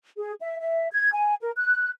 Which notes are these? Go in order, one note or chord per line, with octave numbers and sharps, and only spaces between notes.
G#4
E5
E5
G#6
G#5
A#4
F#6